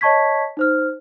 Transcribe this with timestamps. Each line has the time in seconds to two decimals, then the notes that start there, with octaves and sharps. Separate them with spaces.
0.01 C#5 D#5 A5 C#6 G#6 B6
0.57 D#4 C5 F6